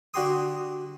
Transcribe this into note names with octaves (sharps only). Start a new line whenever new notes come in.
D3 D4 F#4 G4 C6 D#6